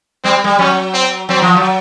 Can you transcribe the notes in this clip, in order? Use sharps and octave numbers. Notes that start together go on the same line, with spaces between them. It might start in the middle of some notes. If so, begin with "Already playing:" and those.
G3 C4
G3
F#3 C#4
C4
F#3 C4
F3
F#3